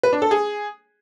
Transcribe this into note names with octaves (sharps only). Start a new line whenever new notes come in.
B4
D4
A4
G#4